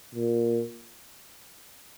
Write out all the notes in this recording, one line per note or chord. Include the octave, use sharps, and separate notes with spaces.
A#2